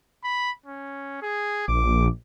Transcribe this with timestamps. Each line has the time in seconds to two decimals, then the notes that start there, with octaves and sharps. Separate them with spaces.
0.24 B5
0.66 C#4
1.22 G#4
1.68 A#1 D6